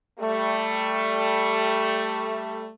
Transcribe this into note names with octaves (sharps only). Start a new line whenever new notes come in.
G3 A3